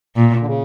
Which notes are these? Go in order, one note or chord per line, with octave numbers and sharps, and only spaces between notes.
A#2
D3
C#3